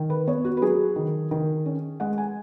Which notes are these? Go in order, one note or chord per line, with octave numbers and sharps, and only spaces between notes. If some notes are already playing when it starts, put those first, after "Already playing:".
Already playing: D#3
B4
B3 C#5
F#4
B4
F#3 G#4
D#3
D#3
C#4
G#3 F#5
G#5